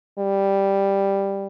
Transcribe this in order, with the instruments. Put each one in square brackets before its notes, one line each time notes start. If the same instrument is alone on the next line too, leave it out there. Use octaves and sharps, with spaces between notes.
[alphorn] G3